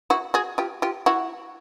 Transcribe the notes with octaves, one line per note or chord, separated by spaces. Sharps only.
E4 F#4
F#4 G#4
F4 G4
F4 G4
E4 F#4